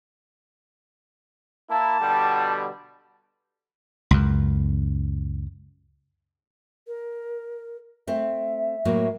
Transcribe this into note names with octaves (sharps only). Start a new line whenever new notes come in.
A#3 E4 A5
B2 D3 G3
C#2 F#2
A#4
A3 C4 E5
A2 F#3 A#3